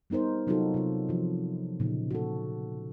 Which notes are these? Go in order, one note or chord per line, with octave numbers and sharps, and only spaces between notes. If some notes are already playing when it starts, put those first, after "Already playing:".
G3 B3 D#4 A#4 C5
C3 F#3 D#4 F4 F#4 A4
C3 F4
E3 F3
A#2 C#3 D#4
F#4 A4